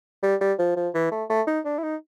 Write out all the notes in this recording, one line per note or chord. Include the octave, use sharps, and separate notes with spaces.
G3
G3
F3
F3
E3
A3
A3
D#4
D4
E4
D#4